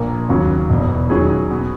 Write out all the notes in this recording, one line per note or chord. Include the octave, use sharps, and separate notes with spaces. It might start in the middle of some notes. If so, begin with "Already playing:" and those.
Already playing: A#1 A#2 A#3
D#2 C#3 F#3 C#4
E1 E2 B2
D#3 F#3 C#4 G#4
B2